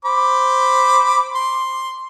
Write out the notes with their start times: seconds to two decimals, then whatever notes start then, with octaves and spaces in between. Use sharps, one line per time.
0.05 C5 B5 D6
1.35 C6